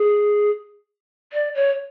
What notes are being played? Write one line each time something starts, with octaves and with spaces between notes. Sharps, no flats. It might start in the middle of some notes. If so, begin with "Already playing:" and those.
Already playing: G#4
D5
C#5